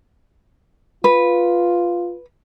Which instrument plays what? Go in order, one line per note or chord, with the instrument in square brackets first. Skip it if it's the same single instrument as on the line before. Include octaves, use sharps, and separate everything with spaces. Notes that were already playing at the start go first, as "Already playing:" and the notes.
[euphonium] F4 [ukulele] B4